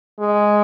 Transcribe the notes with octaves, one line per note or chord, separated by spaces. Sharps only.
G#3